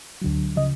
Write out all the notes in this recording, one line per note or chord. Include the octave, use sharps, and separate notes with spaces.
D2 D3 F#3
C#3 F3 D#5